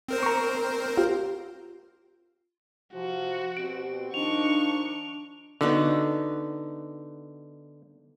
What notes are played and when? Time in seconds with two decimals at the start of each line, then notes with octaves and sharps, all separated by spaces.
0.08 C4 A#4 C5
0.23 A#5 C#6
0.97 F4 G4
2.93 C3 F3 F#4
3.57 B2 C4 G4 D7
4.14 D#3 F3 D4 D#4 C#6 F7
5.61 D3 B3 D#4 F#4